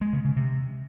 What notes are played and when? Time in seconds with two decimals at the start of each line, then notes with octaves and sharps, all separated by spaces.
0.01 G#3
0.13 C#3
0.25 C#3
0.36 C3